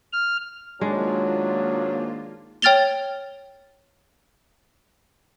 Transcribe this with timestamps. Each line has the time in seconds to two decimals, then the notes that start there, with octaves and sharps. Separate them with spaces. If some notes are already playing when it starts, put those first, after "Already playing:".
0.13 F6
0.81 G#2 D#3 F#3 G#3 A#3 D4 F4
2.62 C#5 G5 F6 A6 F7 G7